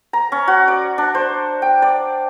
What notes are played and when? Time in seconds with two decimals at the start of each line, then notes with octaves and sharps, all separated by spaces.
0.13 A#5
0.32 C#4
0.48 F#4
0.68 D5
0.98 D4
1.15 C5
1.62 G5
1.82 D5